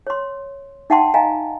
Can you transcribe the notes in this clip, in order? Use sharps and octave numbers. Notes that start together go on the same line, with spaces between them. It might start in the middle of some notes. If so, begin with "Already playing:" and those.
C#5 C6
D#4 E5 F#5 G5 A5 C6
D#5 F5 G#5 A#5